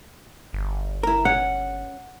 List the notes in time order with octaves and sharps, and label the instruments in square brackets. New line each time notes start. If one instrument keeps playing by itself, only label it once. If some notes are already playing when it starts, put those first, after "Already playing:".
[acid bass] G1
[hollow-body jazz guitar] E4 A#4
[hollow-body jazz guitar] C#4 [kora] F#5